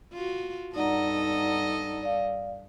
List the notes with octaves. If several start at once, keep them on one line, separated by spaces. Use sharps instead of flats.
F4 F#4
G2 D#4 A4 D5 D#5 F#5 A#5
D5 F5